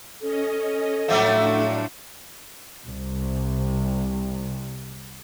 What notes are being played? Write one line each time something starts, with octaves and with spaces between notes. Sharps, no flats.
C#4 A4 D#5
A2 F3 F#3 A3 D4 E5 D6 E6
C2 C3